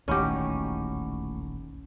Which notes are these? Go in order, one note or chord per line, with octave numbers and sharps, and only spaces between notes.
E1 A#1 D#2 A2 C#4 D#4 F#4 G4